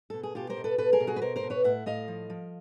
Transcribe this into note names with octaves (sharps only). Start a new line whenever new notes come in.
B2 A4
G#4
B2 F4 G4
A#4 C5
B2
A4 B4
B2 A4 B4
G#4 A#4
B2
F#4 G#4
B4
B2 A#4 C5
A#4 C5
B2
B4 C#5
A2 E5 F#5
A2 D#5 F5
F3
F3